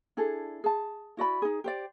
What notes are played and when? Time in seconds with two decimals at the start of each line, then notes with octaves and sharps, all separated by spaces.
0.17 D4 E4 G#4 A4
0.64 G#4 A5
1.17 E4 F#4 D5 B5
1.42 D#4 G#4
1.64 G4 C5 D5